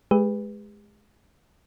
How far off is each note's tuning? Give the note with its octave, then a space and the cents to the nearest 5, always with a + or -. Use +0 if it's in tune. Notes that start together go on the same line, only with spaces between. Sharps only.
G#3 +20 G4 +45 B4 +0